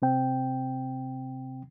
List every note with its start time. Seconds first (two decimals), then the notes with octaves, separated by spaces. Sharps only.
0.02 C3 C4 G5